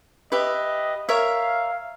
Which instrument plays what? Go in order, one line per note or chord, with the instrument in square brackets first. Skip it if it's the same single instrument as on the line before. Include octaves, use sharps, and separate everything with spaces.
[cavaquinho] G4 B4 E5 [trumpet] D#5
[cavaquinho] A#4 C#5 E5 [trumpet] F5